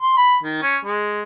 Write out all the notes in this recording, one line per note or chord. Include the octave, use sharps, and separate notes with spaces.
C6
B5
D#3
C#4
G#3